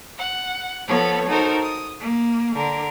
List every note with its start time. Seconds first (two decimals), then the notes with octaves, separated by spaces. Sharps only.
0.18 F#5
0.87 F3 B3 A4 C#5
1.28 D#4 F#4 A4 A#4 C5
1.62 D#6
2.00 A#3
2.55 D3 A#4